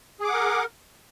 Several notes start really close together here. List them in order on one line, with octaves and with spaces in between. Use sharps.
G#4 D6 F#5 A#4